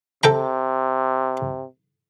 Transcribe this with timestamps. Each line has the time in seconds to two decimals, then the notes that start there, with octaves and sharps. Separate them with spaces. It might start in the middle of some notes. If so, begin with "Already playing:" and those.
0.23 C3 A4 G5 A#5